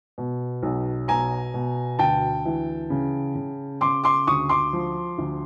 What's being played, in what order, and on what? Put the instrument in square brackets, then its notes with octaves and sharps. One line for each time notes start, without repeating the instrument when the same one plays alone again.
[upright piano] B2
B1
B2 G#5 A#5
B2
D2 G5 A5
E3
C#3
C#3
C#3 C6 D6
C6 D6
D2 C#6 D#6
C6 D6
F3
D2